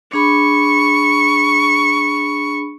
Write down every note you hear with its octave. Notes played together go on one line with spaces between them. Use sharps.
D4 G#4 B5 C#6